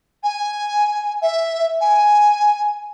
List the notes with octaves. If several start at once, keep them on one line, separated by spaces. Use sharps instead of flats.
G#5
E5
G#5